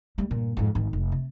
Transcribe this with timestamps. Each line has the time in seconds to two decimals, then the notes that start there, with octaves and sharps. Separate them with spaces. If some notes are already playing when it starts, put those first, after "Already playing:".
0.18 G3 A3
0.31 G2 A#2
0.57 F2 G#2
0.75 G#1 D#3
0.93 F1
1.12 C3